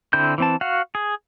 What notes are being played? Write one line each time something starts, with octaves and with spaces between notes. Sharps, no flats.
D3 C4 E4 G6
E3 C4 A5
F#4 F5 F#5
G#4